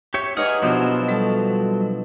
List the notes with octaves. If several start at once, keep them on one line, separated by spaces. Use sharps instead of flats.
G4 C#5 E5
D#4 G4 G#4 B4 C#5 F#5 C#6 F6
B2 F3 F#3 D4 E4 C5
G3 A4 A5